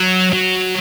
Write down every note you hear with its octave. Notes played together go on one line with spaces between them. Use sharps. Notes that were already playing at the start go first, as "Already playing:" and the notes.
Already playing: F#3
F#3